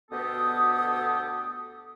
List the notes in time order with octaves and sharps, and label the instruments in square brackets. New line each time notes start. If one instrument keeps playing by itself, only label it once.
[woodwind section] D2 B2 B3 G4 A4 D#6